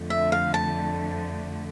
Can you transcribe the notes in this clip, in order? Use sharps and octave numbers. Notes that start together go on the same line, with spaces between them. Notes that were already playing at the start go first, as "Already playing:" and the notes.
Already playing: F2 D3 A3
E5
F5
A5